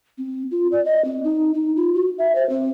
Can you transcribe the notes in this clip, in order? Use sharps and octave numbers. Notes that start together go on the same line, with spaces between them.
C4
F4
D5
D#5
C4
D#4
D#4
F4
F#4
E5
C5
C4